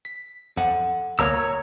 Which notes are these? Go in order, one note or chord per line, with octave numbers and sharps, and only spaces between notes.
B6
F2 A4 F#5
D2 A#3 C#5 A#5 E6